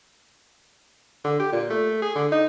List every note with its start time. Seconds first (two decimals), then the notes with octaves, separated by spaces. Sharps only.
1.24 D3
1.39 G4
1.52 A#2
1.70 A3
2.02 G#4
2.15 D3
2.32 D#4